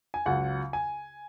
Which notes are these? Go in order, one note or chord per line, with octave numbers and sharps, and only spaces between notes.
G#5
C#2 C#3 F#3 F#5
G#5